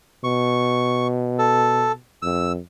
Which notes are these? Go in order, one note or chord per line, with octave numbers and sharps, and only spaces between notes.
B2 C#6
A4
F2 E6